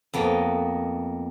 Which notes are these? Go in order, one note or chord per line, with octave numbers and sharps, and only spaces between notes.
F2 A#3 B3 D#5